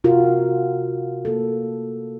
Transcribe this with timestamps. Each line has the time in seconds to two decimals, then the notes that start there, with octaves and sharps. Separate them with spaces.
0.04 C3 F4 F#4 A#4
1.25 A#3 A4